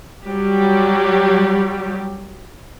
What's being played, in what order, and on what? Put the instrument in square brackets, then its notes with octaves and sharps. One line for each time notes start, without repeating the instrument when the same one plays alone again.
[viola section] F#3 G3 G4